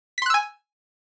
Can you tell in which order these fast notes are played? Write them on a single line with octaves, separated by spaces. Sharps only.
B6 C6 F#6 E6 G#5